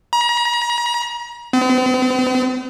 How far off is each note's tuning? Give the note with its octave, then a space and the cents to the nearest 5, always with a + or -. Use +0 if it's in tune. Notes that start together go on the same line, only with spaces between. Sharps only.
A#5 +40
C4 -45